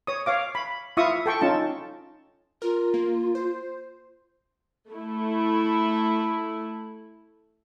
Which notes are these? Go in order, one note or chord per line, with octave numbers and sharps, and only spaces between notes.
C#5 D#6
C#5 F5 D6
B5
E4 F4 E5 F5 C#6 D#6
A4 G5 C#6
C#4 D#4 F4 A5
F4 A#4
A#3
C5
A3 E4